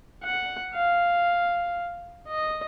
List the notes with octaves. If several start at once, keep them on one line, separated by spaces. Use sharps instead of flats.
F#5
F5
D#5